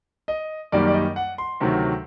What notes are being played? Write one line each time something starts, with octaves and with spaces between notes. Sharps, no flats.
D#5
F#2 D#3 G3 A#3 D5
D5
D#5
F#5
C6
D2 C3 D#3 F#3